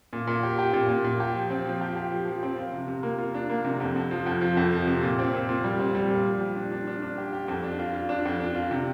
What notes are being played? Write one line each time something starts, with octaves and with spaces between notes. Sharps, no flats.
A#2
A#2
G4
G4
A#2
A#2
A#2
G4
F3
C4
F3
G4
G4
F3
F3
C4
F4
C3
C3
A#3
F4
D4
A#3
C3
F2
F2
F3
F2
F3
F2
F3
C3
A#2
C4
A#2
A#2
G3
C4
G3
A#2
F3
G4
D4
D4
D4
D4
G4
G4
F2
D4
F4
F4
D4
F2
D4
F4
C3